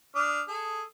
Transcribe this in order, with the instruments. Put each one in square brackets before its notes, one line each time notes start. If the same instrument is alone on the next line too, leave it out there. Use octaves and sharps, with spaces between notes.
[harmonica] D4 D#6 F6
G#4 A4